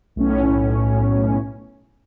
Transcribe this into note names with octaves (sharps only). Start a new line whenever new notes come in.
B1 A2 C#4